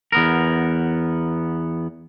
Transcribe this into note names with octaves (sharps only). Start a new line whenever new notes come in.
E2 B3 A#4